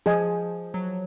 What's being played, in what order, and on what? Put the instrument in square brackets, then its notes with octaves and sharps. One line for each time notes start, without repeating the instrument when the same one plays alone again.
[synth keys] F3 [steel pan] G#4 D#5 G#5
[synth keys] F#3